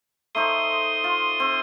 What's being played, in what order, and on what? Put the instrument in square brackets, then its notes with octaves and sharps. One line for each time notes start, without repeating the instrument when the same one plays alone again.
[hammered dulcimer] A3 D#4 C5 [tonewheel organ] C6 D#6
[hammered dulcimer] F4
C4